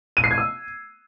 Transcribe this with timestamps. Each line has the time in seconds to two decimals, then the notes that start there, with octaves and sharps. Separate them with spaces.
0.17 D#7
0.24 C7
0.31 G#6
0.38 E6